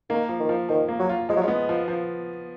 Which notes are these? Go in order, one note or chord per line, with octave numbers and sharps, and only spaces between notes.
D#3 A#3
F3
D#3
F3
D#3 F3
A#3
F#3
F4
F3 G#3
F#3
G#3 B3
F3
F3